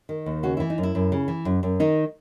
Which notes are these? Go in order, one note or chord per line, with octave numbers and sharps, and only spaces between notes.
D#3
D#2
C#3 F#4
E3 E4
D#4
F#2
E4
F#2
C#3
E3
F#2
F#2
D#3 D#4